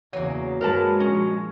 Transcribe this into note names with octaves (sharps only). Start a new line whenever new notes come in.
E2 C#3 F#3 A#3
G2 D#3 G#3 A#4 B4 A5
A#2 F3 C#4